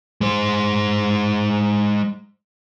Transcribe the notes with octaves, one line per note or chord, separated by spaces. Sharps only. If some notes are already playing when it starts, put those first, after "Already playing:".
G#3 C5